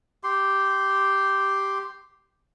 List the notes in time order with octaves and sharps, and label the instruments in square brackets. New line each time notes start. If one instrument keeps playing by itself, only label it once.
[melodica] G4 C6